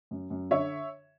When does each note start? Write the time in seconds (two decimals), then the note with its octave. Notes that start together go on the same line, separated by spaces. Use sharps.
0.11 F#2
0.30 F#2
0.50 D3 C#5 E5